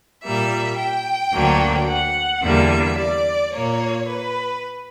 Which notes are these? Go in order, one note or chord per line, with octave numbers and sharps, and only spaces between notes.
A#2 G3 A#3 E5
G5
D2 D3 F#3 A#3
F#5
E2 D3 G3 A#3 E5
D5
A#2 A#3 C#5
B4